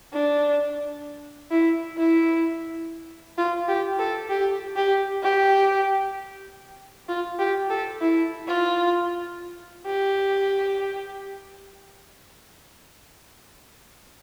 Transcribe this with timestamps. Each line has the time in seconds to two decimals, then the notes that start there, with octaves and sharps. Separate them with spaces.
0.13 D4
1.51 E4
1.98 E4
3.38 F4
3.68 G4
3.99 A4
4.29 G4
4.76 G4
5.23 G4
7.09 F4
7.39 G4
7.70 A4
8.01 E4
8.48 F4
9.86 G4